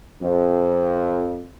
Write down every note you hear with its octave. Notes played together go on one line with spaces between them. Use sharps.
F2